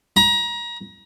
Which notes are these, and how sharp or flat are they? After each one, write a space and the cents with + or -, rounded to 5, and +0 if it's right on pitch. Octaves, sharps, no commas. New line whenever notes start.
A#5 +30